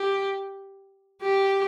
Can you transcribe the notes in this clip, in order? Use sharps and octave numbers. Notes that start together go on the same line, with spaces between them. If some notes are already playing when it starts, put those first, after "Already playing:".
Already playing: G4
G4